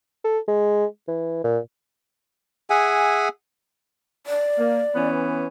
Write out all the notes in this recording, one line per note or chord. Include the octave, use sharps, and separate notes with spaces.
A4
G#3
E3
A#2
G#4 E5 F#5 G#5
D5
A#3
E3 B3 C#4